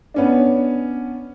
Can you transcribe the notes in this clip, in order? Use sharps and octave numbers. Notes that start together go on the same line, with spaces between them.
B3 C#4 D4